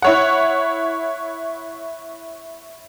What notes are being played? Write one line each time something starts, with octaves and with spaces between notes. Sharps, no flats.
E4 C#5 F#5